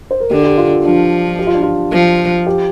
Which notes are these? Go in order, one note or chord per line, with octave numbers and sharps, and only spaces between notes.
C5
A#4
D3 G4
G4
F4
F4
F3 D4
G4
F4
D4
F4
F3
G4